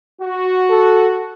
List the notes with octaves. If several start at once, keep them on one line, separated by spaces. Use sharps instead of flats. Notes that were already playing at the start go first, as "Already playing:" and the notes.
F#4
A4